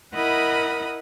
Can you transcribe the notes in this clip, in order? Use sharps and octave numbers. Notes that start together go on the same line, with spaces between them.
E4 A#4 D#5 F#5 B5 D#6